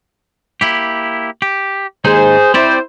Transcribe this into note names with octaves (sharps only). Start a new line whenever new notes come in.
A#3 E4 G4
G4
D#2 G#3 D#4 G#4 C5
C4 E4 G4 C5 D5